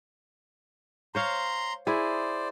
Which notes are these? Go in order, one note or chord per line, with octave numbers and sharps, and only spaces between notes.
C5 C#5 F5 A#5 C6
E4 G#4 C5 D5